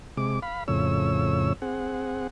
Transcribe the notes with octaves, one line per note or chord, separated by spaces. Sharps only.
C3 G#3 D6
F5 B5
F2 A2 C#3 C#5 E6
C4 G#4 F#5